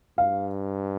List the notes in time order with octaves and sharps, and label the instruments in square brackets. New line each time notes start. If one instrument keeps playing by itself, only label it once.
[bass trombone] G2 [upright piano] F5